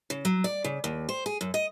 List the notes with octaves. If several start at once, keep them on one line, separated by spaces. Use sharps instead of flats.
C#3
F#3
D5
C#3
D#2
C5
G#4
F#2
D#5